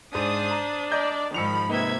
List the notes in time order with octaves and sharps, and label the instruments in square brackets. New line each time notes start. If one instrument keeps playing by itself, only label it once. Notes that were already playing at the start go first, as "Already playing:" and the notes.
[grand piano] G#2 [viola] D4 [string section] C5 D#6
[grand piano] A#5
[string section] D5 A5 [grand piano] D#5 A#5 G6
[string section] G#2 D#3 B5 [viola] F3 [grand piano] E6 C#7 F7
[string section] C3 G#6 [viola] A#3 E5 [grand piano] D#4 B4 G7